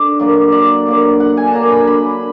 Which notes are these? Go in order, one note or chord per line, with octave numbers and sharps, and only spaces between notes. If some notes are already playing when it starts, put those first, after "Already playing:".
Already playing: D3 D5
F#3 A#3 D4
D3 D5
F#3 A#3 D4
D3 F#5
G#5
A5
F#3 A#3 D4 A#5
B5
D3 B5